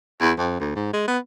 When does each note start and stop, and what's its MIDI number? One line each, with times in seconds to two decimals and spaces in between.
0.21 0.32 40
0.38 0.59 41
0.60 0.73 38
0.76 0.91 44
0.93 1.04 56
1.08 1.18 59